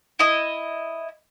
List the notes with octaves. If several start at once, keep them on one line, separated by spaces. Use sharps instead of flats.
E4 D#5